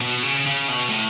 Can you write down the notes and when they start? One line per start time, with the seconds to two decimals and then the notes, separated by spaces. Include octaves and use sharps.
0.01 B2
0.23 C#3
0.46 C#3
0.68 B2
0.90 A2